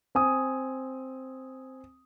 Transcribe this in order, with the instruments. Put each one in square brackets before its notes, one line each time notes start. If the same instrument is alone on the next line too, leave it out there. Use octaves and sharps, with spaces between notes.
[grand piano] C4 G#5 D#6